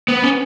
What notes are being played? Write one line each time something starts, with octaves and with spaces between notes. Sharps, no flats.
B3
C#4